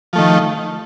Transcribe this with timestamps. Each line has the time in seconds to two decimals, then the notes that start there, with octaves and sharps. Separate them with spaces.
0.13 F3
0.16 A3
0.18 D#3